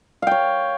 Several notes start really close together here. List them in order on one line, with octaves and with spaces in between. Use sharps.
F5 G5 C#5